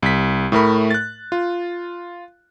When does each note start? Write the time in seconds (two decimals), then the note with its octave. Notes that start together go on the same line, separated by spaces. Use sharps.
0.03 C2 B6
0.52 A2 A3 A#4 B5
0.91 F#6 A6
1.32 F4